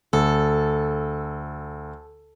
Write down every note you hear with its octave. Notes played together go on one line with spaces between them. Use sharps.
D2 A4